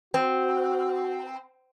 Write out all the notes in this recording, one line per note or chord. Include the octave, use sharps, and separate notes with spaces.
C4 F#4